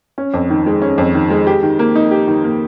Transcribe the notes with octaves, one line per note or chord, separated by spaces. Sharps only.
C#4
F2
D#3
G#3
C#4
F2
D#3
G#3
G4
D#3
A#3
D#4
G4
D#3
A#3